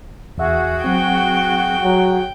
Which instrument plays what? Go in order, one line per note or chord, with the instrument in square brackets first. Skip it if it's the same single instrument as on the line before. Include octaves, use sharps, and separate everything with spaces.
[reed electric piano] E2 E5 [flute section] F#4 G#4
[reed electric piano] F#3 C4 [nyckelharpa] G5
[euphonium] F#3